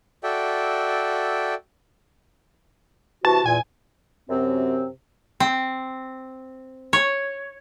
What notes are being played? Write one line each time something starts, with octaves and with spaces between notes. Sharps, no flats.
F#4 A4 D5 E5 G5
C3 E3 F#4 A5
E2 A#2 G#5
F#2 C3 C4
C4
C#5